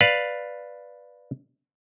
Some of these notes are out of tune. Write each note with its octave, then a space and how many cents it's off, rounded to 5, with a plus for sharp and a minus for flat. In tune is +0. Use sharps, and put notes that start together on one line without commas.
B4 +0 D5 +0 F5 +0